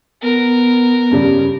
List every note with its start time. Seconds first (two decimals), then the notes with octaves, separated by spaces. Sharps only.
0.22 B3 A#4
1.11 G2 C#3 G3